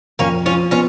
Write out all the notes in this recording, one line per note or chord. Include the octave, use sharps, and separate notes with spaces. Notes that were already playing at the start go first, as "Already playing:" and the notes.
F2 A#3 C#4
F3 C#4 F4
B3 C#4 F4